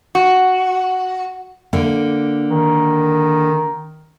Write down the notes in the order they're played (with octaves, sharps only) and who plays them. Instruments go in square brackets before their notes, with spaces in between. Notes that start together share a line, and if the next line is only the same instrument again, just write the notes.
[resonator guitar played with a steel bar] F#4
[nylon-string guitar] D3 A#3
[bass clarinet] D#3